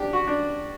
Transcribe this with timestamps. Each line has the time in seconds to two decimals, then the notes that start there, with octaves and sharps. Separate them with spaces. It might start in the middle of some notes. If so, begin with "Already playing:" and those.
Already playing: D4 G4
0.13 F#4
0.28 D4